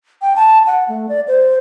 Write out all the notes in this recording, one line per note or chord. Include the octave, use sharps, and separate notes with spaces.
G5
A5
F#5
A3
D5
C5